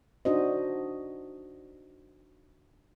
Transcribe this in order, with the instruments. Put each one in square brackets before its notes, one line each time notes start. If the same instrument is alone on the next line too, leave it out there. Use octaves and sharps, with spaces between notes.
[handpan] D4 D#4 F#4 C5 D#5